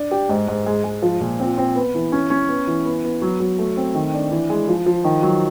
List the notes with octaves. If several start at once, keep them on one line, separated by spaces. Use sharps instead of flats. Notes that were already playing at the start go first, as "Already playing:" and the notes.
Already playing: D4
G4
G#2
G#2
G#3
G#3
F3
A#2
C4
C4
B3
E3
C#4
C#4
B3
E3
B3
B3
F#3
F#3
A3
C4
D#3
D4
E3
G#3
F3
F3
D#3
F#3